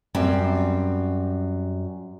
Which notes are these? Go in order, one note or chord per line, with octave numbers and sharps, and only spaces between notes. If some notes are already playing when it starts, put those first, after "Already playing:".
F#2 G3 C4